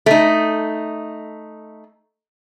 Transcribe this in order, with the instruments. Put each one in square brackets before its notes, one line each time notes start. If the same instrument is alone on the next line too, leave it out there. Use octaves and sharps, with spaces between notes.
[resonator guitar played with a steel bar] A3 D#4